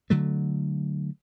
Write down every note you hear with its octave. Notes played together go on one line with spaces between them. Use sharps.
D3 F#3 A3